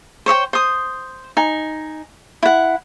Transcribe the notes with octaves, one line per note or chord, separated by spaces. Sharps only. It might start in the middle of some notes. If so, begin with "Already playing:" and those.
C5 C#5 D#5 G5
C5 D#6
D#4 G#5
E4 F#5